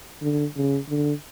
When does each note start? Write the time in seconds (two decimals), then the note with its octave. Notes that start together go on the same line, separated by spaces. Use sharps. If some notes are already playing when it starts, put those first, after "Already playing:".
0.22 D3
0.56 C#3
0.89 D3